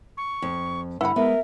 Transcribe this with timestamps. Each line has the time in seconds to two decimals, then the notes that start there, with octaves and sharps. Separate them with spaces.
0.17 C#6
0.42 F2
1.01 G2 D3 E4 F#5 B5
1.16 G#3 B3 A#4 E5